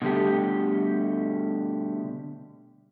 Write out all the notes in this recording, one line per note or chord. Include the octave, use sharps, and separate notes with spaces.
B2 D3 G3 A3 G4